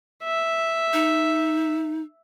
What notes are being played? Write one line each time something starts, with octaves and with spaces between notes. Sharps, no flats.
E5
D#4